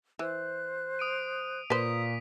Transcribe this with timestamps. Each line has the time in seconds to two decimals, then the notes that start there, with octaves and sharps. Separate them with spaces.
0.19 E3 C5 F#6
0.99 D#6 D7 D#7
1.70 A#2 B4 C5 D#6 B6